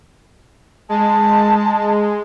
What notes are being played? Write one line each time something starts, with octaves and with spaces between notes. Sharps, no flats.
G#3 A5